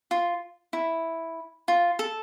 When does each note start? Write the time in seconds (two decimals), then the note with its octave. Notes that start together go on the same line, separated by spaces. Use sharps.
0.11 F4
0.73 E4
1.68 F4
1.99 A4